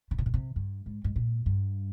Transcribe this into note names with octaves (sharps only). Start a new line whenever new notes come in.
C#3
C3
A#2
C3
G2
G#2
G#2
A#2
G2